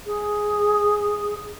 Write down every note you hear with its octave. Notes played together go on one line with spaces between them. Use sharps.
G#4